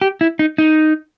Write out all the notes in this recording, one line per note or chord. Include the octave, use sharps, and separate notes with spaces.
G4
E4
D#4
D#4